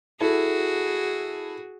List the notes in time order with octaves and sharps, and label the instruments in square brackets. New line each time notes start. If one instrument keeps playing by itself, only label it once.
[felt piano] E4 A4 [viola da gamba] F#4 G#4